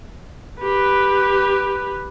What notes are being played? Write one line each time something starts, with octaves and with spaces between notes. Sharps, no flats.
G4 B4